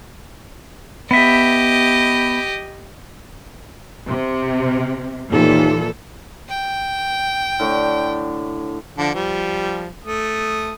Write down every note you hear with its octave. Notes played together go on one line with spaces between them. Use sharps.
B3 G4 D#5 E5
C3
D#2 A#2 E3 A4
G5
A2 D3 C#6
D3 F3 D4
F3 G3
A3 D#6